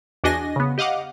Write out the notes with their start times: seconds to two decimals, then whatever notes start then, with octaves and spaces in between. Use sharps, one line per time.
0.24 E2 D4 F#4 D#5 G#5 A#6
0.56 C#3 B3
0.78 G4 D#5 F5 F#5 D6